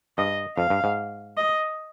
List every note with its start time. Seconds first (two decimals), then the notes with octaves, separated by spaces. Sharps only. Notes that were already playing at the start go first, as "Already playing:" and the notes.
0.18 G2 D#5
0.57 F2 F5
0.70 G2
0.84 G#2
1.37 D#5